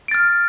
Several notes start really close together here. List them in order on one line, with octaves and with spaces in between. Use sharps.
D7 A6 F6